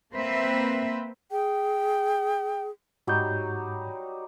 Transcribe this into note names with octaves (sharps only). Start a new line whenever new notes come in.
A#3 C4 B4 C5 E5
G#4 G5
G#2 F#3 G3 D#4 G6